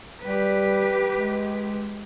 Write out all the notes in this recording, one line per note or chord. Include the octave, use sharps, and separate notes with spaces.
G3 G4 B4
G#3